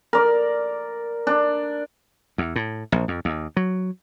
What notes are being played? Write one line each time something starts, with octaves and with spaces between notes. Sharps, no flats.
A#4 D5
D4
E2
A2
A#1
F2
D#2
F#3